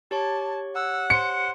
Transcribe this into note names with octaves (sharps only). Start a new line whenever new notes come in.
G4 C#5 A5 C#6
F#5 E6
C5 C#7